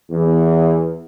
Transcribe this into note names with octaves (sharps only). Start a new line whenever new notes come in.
E2